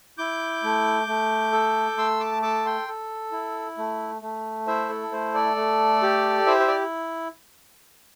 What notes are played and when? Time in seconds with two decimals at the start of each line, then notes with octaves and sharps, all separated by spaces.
0.18 E4 D6 G6
0.64 A3
1.07 A3
1.52 A4
1.97 A3 C6 E6
2.20 A5 D6
2.42 A4 A5 D6
2.65 G5 C6
2.88 A4
3.32 E4
3.78 A3
4.22 A3
4.67 E4 C5 E5
4.89 A4
5.12 A3 C5
5.34 A4 D5
5.57 A3
6.02 G4
6.46 E4 C5 E5
6.60 C5
6.68 D5